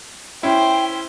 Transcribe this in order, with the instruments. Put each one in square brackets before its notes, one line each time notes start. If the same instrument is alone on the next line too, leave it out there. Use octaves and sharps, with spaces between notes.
[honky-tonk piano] C#4 E4 [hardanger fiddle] C5 [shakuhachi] G5